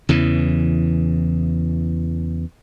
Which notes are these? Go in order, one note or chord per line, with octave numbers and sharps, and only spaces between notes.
E2 C#3 E3